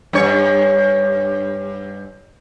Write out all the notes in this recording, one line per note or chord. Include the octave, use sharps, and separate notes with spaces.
G2 C#5